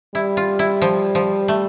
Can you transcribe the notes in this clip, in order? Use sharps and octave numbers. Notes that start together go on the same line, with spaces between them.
G3 E4
F4
E4
F3
F3
A3